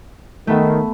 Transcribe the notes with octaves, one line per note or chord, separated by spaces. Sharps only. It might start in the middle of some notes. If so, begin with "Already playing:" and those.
D#3 A3 B3 A4